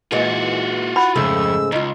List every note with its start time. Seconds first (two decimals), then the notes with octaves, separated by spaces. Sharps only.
0.12 A#2 E3 G#3 F4 F#4
0.96 F#5 B5
1.16 F2 G#2 C#3 A3 E6
1.72 C#2 D#4 F4